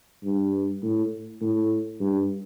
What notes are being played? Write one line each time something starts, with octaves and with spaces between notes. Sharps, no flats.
G2
A2
A2
G2